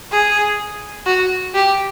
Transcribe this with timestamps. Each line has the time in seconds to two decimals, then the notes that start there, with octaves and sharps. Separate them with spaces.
0.12 G#4
1.06 F#4
1.54 G4